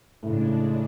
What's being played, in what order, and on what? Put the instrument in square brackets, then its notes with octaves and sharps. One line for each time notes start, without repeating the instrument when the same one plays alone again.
[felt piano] A2 [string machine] C#3 G#3 D4